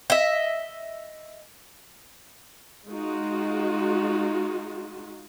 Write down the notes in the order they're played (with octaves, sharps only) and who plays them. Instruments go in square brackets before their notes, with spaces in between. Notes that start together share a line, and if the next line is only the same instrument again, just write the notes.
[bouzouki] D#5 E5
[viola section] G#3 D#4 F4 F#4